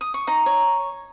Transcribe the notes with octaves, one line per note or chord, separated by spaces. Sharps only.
D#6
C#6
D#4 A#5
C#5